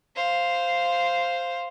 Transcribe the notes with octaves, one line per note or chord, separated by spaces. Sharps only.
C5 F5